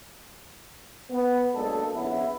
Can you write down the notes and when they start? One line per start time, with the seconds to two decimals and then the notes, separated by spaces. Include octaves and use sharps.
1.11 B3
1.54 B1 G#3 A#3 D4 G#4 A4
1.94 A#1 C#3 B3 E4